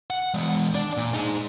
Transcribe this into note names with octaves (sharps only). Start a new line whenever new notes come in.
F#5
E3 G#3
D4 D5
A#2
D#4 G#4